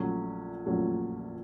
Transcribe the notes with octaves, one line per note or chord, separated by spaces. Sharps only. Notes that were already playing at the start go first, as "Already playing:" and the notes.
Already playing: A#1 A#2 F#3 A3 C#4
A#1 A#2 F#3 A3 C#4